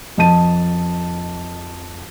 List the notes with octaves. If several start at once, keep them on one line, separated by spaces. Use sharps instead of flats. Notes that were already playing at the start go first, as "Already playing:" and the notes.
F2 D#5 A5 D#7